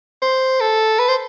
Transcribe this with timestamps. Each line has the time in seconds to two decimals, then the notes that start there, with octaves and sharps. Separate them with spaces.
0.22 C5
0.60 A4
0.99 B4
1.08 C5